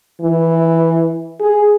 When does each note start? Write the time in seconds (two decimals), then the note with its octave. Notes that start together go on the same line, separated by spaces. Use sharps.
0.21 E3
1.40 G#4